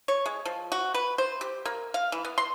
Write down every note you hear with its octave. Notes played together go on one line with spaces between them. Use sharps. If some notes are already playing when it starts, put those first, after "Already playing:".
C#5
G#3
F3
F#4
B4
C5
G4
A#3
F5
E3
B3
C6